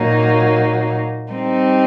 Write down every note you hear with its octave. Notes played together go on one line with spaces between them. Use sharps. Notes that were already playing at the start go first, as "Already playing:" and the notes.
Already playing: A#2 F#3 A#3 D#4
G3 C4 D#4